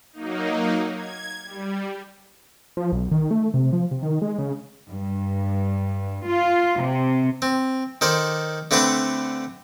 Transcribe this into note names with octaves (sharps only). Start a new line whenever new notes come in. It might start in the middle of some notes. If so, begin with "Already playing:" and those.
F#3 A#3 D#4
G#6
G3
F3
B1
D#3
A3
C3
F3
C3
D#3
G#3
C#3
G2
F4
C3
C4
D#3 A4 C5 D5
D3 A3 C4 B4 A5 D6